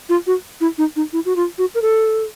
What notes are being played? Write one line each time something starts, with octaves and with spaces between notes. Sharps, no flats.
F4
F#4
E4
D#4
D#4
E4
F#4
F4
F#4
A#4
A4